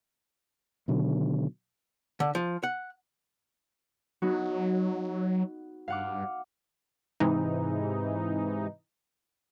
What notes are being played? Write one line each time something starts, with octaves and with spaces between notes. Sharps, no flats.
B2 D3 D#3 F#3
D3
F3
F#5
F#3 B3 D#4 F#4
G2 F5 F#5 D6
G#2 C3 E3 D#4